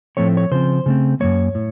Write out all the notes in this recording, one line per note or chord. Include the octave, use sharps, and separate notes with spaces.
A2 F3 A3 C4 C#5
C#5
C#3 F3 C4 C5
C#3 A3 C4
F#2 F3 A#3 C#5
A2